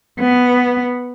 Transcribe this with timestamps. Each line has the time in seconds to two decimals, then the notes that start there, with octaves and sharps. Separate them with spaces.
0.20 B3